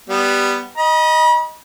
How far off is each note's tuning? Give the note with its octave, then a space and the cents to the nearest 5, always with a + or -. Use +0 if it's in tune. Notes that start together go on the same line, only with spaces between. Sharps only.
G3 +0 B3 +0
D#5 +0 B5 -40